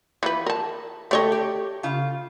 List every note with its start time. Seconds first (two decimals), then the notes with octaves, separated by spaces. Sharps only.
0.23 E3 F3 B4
0.46 A#4 A5
1.11 A3 G4 A4 C#5 D#5
1.32 G4
1.83 C#3 F4